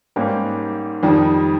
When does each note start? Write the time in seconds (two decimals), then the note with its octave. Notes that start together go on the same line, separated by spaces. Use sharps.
0.16 G#2 G3 A#3 C#4 G4
1.03 F2 D#3 G3